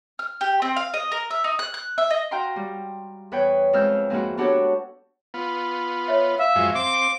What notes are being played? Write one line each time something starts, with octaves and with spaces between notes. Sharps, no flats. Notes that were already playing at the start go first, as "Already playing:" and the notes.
F6
G4
C4
F5
D#5
A#4
E5
D#4
F#6
F#6
E5
D#5
F#4 F5 G5 A#5 C6
G3
E2 B4 C#5 G5
F2 G#3 F5 E6 F6 G6
G#2 F3 A#3 C4 E4 F#4
B3 D4 F#4 G4 A4 C#5
B3 F4
C#5 E5
E5 F5
F#2 F3 G#3
C4 D6